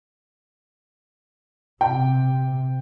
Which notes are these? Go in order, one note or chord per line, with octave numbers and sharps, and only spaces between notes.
C3 G5